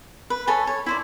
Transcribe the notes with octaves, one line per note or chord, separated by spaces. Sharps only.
B4
A4 C#5 G#5 B5
C#5
E4 C5 D5